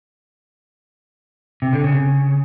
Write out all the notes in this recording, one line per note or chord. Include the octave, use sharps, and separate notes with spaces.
C3
D3
C#3